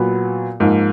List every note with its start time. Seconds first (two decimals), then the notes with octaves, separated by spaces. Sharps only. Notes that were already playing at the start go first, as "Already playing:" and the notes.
Already playing: A#2 F#3 B3
0.60 G#2 F3 A#3